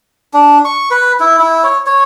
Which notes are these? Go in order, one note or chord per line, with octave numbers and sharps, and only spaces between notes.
D4
C#6
B4
E4
E4
C#5
C#5